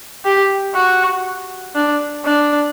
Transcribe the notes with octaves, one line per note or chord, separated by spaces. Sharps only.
G4
F#4
D4
D4